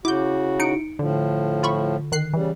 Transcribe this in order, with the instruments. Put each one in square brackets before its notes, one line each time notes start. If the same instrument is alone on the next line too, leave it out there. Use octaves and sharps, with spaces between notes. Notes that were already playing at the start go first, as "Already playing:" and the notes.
[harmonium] C#3 F#4 [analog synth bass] E4 [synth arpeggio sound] D6 G6
[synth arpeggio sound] D#4 C#7 D7
[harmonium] A2 F3 [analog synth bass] D3
[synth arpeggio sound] F4 B5 C#6
D#3 F#6 C7
[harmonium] C#3 G3 [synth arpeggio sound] E3